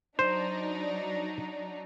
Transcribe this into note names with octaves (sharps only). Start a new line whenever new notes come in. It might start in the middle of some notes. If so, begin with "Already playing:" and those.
F#3 D4 D#4 C5